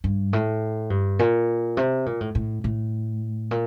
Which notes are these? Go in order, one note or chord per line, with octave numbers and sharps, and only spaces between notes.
G2
A2
G2
A#2
C3
A#2
A2
A2
A2
A#2